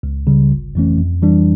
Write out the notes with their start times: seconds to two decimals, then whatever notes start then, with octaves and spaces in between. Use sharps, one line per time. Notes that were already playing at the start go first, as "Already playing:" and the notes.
0.03 C#2
0.27 C#3 G3
0.52 G1
0.75 F2 E3 A3 C#4
0.98 F2
1.23 E3 G3 D4